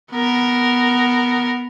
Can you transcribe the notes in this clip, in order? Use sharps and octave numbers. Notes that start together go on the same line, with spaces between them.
B3 A#4